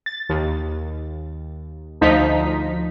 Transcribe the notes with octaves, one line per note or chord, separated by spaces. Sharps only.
A6
D#2
D2 F3 D#4 B6